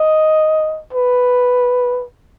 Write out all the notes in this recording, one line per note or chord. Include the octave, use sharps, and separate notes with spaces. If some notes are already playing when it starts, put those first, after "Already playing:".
Already playing: D#5
B4